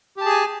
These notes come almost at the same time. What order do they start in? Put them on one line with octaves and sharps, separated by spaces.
G4 A5 G#4 G#5